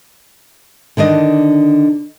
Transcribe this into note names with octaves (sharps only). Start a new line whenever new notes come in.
D3 D#3 D4 D#5